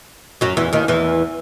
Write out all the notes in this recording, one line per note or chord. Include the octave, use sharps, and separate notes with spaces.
F#2 F#3
E2 E3
D#2 D#3
E2 E3